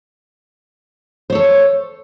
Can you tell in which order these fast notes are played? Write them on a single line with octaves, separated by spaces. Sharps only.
C5 C#5 A4